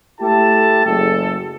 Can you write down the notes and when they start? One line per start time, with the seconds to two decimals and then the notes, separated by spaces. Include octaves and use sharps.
0.21 A3 E4 G4 A4 A5
0.86 F#1 A4